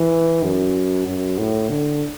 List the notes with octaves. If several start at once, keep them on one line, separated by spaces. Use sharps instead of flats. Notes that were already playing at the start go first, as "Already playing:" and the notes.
Already playing: E3
F#2
F#2
A2
D3